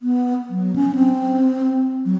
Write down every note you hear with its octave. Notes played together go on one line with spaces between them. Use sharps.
B3
F#3
C#4
C4
F#3